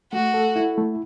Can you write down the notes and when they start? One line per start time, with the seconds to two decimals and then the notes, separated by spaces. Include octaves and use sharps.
0.12 A3 F#4
0.34 A4
0.56 E4
0.78 A3